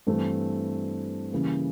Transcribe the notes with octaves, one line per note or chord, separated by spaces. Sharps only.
G2 E3 A3 C4
C#3 E3 G3 A#3